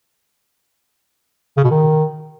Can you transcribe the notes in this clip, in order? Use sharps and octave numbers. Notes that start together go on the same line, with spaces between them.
C#3
B2
D#3